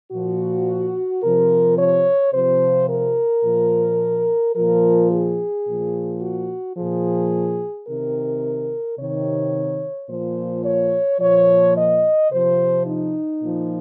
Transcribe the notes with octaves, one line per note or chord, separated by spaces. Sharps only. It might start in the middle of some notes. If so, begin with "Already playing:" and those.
A#2 F3 F#4
C3 F3 A#4
C#5
C3 F3 C5
A#4
A#2 F3
A#2 F3 A#4
G#4
A#2 F3
F#4
A#2 F3 G#4
C3 D#3 A#4
C3 D#3 C#5
A#2 F3 C5
C#5
A#2 F3 C#5
D#5
C3 F3 C5
D#4
A#2 F3